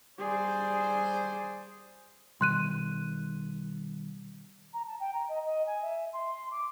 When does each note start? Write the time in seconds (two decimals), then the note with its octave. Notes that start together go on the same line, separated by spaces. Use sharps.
0.19 G3 G#4 C5 D5
2.41 B2 D#3 G3 C6 F#6 D#7
4.73 A#5
4.87 A5
5.00 G5
5.13 A#5
5.29 D#5
5.45 D#5
5.67 G#5
5.82 E5
6.13 C6
6.51 D6